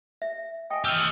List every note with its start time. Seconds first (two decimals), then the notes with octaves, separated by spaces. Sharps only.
0.22 E5
0.70 D#5 G5 G#5
0.85 G4 D#5 E6 F6